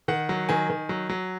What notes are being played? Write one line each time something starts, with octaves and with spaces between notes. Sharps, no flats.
D#3 F#5
F#3
D#3 G#5
D#3
F#3
F#3